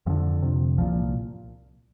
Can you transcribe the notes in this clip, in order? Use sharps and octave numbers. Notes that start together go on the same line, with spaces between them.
F2 D3 F3
F2 C3
C2 A#2 F3